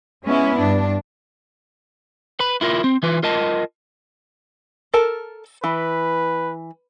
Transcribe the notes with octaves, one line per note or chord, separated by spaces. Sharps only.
G#3 B3 C#4 E4
G2 D4
B4 B5
E4 F4 A#4
C4
E3 F4 B4
F4 A#4 D#5 A5
A4 A#4 A5
E3 B4